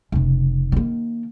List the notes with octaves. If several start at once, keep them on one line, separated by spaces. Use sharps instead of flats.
F1 C#3
D#3 A#3